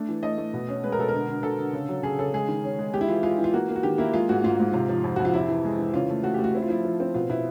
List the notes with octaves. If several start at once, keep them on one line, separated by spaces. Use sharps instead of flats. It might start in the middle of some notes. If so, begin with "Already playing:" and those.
Already playing: A3 D4
E3
A3 D#5
A3
B2
C#4
G#3 B4
A#4
B2 A4
D3 A#4
D3
D3 A4
D3
C#3
F#3
C#3 G#4
C#3 A4
G#3 G#4
D#3
C#4
G#3
G#3 G4
E4
E3 F4
G#3 F4
E3
F4
A#3 F#4
A#3
F#4
D#3 G4
A#3 E4
G#3 F4
G#2 F#4
G#2 F4
G#2
C3 F4
F3
F2
F2 F#4
F4
C3 E4
E3
G#3
E3
C#3 F4
A3
A3 F#4
A3 G4
F#4
C4 E4
F4
F3 E4
F3
C4
B2 F4
B2 E4